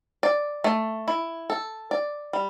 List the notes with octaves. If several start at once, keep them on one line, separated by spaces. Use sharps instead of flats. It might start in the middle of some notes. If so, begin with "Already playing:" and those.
D5
A3
E4
A4
D5
G3